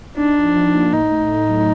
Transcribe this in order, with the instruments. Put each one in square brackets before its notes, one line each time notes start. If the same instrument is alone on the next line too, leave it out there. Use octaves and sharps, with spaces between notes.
[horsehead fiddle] D4 [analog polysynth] D#4
[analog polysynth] F3
F3
A#3
[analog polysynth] A2 [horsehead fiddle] D#4
[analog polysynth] A3
A3
F#3